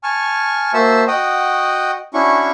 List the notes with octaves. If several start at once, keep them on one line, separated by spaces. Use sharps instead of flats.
G#5 A5 C#6 F6
A#3 F#4 C5 E5 A5 E6
F#4 D#5 F#5 G5 D#6
C#4 D4 E4 F#4 C#6